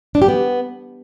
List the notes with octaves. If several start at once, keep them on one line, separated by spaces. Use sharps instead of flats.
D4
G4
B3